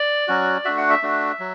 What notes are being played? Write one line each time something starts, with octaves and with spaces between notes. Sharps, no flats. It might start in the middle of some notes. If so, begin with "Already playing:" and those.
Already playing: D5
F#3 C#4 F#4
A3 D4 F#4 E5
F#5
E5
A3 D4 F#4
F#3